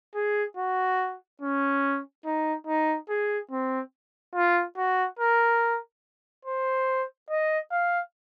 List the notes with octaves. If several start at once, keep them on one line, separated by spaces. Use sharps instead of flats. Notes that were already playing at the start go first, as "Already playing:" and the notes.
G#4
F#4
C#4
D#4
D#4
G#4
C4
F4
F#4
A#4
C5
D#5
F5